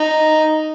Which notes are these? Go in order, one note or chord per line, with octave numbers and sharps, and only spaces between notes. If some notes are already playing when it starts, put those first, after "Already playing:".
Already playing: D#4